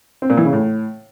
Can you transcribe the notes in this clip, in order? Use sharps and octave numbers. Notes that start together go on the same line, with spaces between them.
C4
A#2
E3
C#3
A2